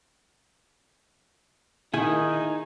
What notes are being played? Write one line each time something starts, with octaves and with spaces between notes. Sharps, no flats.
D#3 D#4 E4 G#4